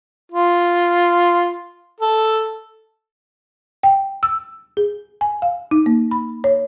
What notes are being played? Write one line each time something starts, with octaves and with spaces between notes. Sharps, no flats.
F4
A4
G5
E6
G#4
G#5
F5
D#4
A#3
B5
C#5